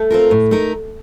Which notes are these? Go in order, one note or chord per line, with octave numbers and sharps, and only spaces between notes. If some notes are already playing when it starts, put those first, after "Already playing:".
Already playing: A3
C4 F4 A#4
A2
A3 D#4 A#4